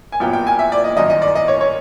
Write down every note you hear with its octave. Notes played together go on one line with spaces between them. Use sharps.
G#5
A#1 A#2 F#3 B3 G5
G5
G#5
E5
D5
D#5
G1 F#2 D#3 D#5
D#5
D5
D#5
C#5
C#5